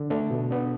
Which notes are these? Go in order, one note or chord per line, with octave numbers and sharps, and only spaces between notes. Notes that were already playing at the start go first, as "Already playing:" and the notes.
Already playing: D3
A3 D4
B2
B3 D4